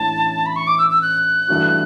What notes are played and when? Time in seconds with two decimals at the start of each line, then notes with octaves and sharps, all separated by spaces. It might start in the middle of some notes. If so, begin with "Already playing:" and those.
Already playing: A1 A2 E3 A3 D4 A5
0.46 B5
0.56 C#6
0.67 D6
0.78 E6
0.90 E6
1.02 F#6
1.48 G2 E3 A3 D4 F#4